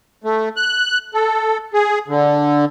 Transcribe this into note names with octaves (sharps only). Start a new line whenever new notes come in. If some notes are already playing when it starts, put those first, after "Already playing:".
A3
F#6
A4
G#4
D3